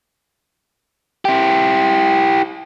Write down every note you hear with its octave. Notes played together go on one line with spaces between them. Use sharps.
E4 G4